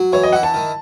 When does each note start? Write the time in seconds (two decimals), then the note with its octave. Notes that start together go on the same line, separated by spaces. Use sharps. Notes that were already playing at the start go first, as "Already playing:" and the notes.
Already playing: F#3
0.13 E3 C#5
0.23 D#5
0.32 E4 F#5
0.43 A5
0.54 D#3